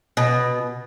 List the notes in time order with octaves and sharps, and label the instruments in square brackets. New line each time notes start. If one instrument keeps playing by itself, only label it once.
[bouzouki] B2